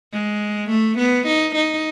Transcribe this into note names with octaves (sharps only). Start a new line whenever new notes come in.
G#3
A3
B3
D#4
D#4